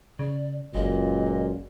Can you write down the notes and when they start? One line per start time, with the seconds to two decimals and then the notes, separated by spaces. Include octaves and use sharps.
0.19 C#3 D5
0.75 F#1 C#2 F#2 A#2 D#5